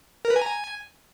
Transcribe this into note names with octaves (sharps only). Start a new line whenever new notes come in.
A#4
B4
G#5
A#5
G#5